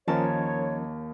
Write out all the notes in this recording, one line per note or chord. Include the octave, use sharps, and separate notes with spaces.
D#2 D#3 F3 C#4 A#4 C#5 A5